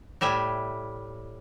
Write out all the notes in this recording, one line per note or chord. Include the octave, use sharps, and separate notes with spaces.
A2 G3 E5 G#5